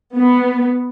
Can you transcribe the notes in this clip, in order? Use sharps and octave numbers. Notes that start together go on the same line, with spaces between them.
B3